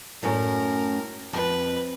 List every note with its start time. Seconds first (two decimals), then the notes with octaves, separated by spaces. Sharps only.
0.23 F#2 A2 C#4 A#4
1.33 F2 B4